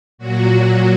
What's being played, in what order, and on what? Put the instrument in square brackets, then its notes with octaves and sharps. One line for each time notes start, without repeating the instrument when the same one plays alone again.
[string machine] A#2 F#3 F#4